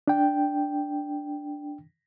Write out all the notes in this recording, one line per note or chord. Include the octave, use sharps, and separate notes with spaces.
D4 G5